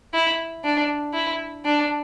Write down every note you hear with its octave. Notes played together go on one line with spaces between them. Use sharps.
E4
D4
E4
D4